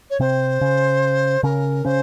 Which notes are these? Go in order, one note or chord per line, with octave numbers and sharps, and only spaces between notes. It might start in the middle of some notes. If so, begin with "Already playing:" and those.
C#5
C3 C4 C5
C#3 C#4
C#3 C#4 A#4
C#3 C#4 C5